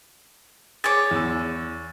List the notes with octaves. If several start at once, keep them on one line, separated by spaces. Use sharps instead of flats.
G#4 C#5 D6 G#6 A6
E2 E6